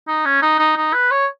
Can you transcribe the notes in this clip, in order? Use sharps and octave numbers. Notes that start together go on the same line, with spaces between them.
D#4
C#4
D#4
D#4
D#4
B4
C#5